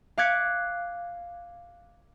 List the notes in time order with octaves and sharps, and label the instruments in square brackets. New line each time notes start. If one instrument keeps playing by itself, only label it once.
[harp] F5 D6 F#6 G#6 B6 C#7